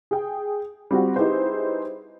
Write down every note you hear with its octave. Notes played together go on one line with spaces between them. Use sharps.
G#4 G5
G3 C4 F4 F#4
D#4 E4 G4 G#4 B4 C5